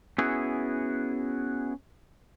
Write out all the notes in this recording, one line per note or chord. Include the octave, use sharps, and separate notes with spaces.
B3 C#4 E4 F#4 G#4